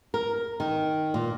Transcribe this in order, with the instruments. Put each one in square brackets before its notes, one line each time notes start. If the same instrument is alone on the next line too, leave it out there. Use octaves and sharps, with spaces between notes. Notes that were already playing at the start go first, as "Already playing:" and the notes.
[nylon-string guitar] A#4
D#3
A#2